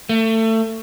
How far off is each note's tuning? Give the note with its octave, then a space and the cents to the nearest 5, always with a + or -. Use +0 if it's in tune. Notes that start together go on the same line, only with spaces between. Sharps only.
A3 +25